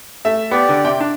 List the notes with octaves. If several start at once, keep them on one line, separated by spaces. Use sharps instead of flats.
A3 E5
B3 G4 D5
D3
C3 G5
D4